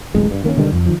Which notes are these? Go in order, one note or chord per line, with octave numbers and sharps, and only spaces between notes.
D1 A1 G#3
G2
D#3 A#3 B3 C#4
B2 D3 D#3 G3
F2
D#3 F3